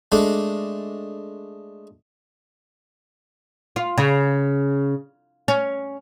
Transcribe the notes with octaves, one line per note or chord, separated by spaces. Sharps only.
G#3 A3 D4
F4
C#3
C#4